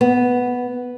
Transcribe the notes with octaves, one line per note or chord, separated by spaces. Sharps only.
B3